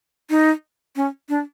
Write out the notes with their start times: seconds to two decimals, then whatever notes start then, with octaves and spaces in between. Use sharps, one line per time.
0.30 D#4
0.96 C#4
1.29 D4